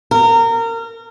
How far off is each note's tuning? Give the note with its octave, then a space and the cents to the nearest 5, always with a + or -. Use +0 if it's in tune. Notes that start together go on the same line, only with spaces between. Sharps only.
A#4 -25